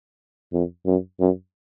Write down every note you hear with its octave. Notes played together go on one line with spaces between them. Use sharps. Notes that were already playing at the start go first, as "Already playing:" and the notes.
F2
F#2
F#2